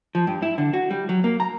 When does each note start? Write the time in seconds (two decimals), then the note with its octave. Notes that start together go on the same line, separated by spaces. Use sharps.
0.15 F3
0.27 G2
0.42 E4
0.58 D3
0.74 F#4
0.91 G3
1.09 F#3
1.24 A#3
1.40 A#5